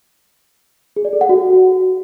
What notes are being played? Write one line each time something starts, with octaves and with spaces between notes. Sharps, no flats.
G#4
D5
A4
F#5
F#4